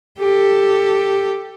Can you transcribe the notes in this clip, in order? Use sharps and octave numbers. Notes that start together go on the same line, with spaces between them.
G4 A4